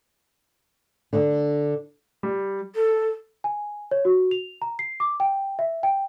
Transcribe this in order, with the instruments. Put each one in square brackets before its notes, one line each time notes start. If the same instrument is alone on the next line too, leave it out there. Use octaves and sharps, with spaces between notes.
[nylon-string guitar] D3 D4
[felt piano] G3
[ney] A4
[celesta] G#5
C#5
F#4
F7
A#5
C7
D6
G5
E5
G5